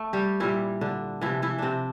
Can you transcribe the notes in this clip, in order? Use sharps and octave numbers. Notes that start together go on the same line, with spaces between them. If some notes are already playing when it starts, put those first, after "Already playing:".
Already playing: A3
G3 G4
A#2 E3 G3 E4
D3 D4
C3 E3 F3 E4
E3 E4
C3 C4 D4